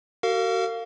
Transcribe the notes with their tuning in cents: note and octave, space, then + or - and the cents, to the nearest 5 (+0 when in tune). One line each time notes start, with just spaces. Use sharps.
F#4 +35 A#4 -35 F5 +0